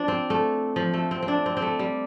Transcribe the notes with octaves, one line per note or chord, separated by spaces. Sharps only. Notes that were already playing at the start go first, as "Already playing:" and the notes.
Already playing: F3 D4
C4
A3
F3
A3
C4
C4
D4
C4
C4
A3
G3